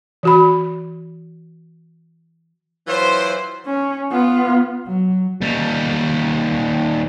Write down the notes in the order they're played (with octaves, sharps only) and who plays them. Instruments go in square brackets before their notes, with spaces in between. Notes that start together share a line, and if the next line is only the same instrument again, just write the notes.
[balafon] E3 F#4 B5
[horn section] E3 F#3 E4 F4 C5
[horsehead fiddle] C#4
B3 F4
[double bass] F#3
[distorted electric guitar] D#2 G3